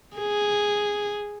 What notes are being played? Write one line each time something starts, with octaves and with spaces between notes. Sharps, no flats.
G#4